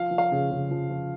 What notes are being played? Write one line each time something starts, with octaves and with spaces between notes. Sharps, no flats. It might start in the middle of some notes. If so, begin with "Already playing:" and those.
Already playing: F3 F5
F3
F5
C#3
C#3
F3
F3